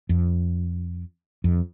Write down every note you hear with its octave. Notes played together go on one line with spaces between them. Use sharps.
F2
F2